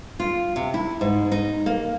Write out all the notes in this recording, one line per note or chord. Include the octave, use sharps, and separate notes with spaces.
F4
C3
E4
G#2
D#4
A#3